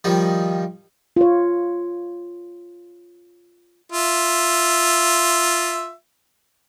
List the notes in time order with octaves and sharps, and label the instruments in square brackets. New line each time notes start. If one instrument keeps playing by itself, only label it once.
[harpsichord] D#3 F3 G3
[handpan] F4 C#5
[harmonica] F4 E5